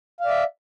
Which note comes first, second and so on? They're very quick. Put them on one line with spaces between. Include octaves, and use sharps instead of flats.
F5 D5 E5